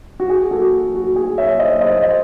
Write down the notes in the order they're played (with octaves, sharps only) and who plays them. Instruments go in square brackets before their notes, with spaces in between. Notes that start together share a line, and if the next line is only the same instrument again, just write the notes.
[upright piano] F#4
G#4
F#4 A4
F#4
G#4
C#5 E5
C5 D#5
C5 D#5
C5 D#5